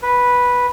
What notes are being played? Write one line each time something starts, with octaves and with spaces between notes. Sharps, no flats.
B4